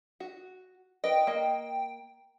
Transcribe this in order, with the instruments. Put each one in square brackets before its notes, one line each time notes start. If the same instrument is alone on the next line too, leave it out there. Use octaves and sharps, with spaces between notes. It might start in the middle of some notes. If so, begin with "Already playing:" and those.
[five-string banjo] F#4
[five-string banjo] B4 D#5 [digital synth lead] G5
[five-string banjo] A#3 D#5